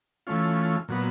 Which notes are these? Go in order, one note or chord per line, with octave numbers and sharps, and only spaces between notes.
E3 A3 C#4 F4
A#2 F#3 B3